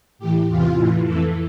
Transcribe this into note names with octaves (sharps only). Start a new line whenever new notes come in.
A2 E3 G4
E2 C3 E3 F4
A2 E3
F2 E3 A4